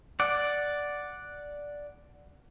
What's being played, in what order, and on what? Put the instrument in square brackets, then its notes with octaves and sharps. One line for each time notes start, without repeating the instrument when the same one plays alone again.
[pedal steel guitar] D5 F#5